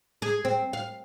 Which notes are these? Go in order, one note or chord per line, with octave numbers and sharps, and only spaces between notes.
G#4
C4
F5